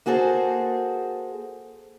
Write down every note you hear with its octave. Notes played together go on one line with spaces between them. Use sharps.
A#3 F#4 G#4 A4 C5